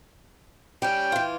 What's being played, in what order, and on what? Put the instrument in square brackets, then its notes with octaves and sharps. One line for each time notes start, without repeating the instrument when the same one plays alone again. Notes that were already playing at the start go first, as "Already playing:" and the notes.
[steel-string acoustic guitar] G3 C#4 [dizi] G5
[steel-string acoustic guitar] E3 F4